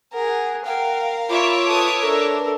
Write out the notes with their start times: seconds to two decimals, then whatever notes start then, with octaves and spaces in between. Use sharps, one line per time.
0.13 G#4 A#4 F#5
0.66 A#4 F5 G5
1.29 F4 C#5 E5 B5 D6
1.65 A4 B4 D#6
2.01 D4 A4 A#4